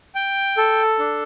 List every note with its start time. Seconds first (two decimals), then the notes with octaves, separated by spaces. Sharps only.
0.15 G5
0.57 A4
0.99 D4